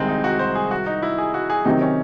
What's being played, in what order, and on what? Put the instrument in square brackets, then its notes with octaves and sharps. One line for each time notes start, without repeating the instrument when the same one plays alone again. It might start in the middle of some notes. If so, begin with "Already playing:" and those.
Already playing: [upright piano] C2 C3 D#3 [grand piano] G#3 C4
[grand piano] D#4
F#4
C5
G#4
F#4
D#4
E4
G#4
F#4
G#4
[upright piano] C3 D#3 F#3 C4 [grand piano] D#4
[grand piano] C#4